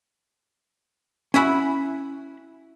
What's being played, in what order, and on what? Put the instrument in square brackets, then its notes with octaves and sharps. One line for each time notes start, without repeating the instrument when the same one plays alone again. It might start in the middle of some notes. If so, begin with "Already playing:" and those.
[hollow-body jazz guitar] C#4 E5 B5 [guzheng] E4 F#4 G#5